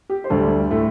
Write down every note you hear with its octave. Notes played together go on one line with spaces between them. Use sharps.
G4
C5
D2 D3 G3 A4
A2 A3